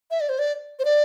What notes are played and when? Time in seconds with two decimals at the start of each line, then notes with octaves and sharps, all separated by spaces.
0.11 E5
0.21 D5
0.29 C5
0.39 D5
0.79 C5
0.85 D5